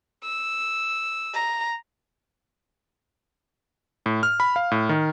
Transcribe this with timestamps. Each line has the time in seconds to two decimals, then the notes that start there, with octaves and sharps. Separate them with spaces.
0.23 E6
1.34 A#5
4.06 A2
4.23 F6
4.40 B5
4.56 F5
4.71 A2
4.89 D#3